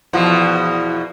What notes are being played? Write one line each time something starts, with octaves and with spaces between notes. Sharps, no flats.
E2 B2 F3